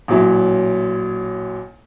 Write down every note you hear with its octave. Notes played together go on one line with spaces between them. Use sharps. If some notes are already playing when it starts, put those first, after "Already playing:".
A1 A#2 F#3 E4